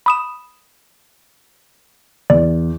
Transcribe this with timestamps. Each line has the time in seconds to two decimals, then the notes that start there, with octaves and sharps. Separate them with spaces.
0.06 B5 D#6 E7
2.30 E2 D5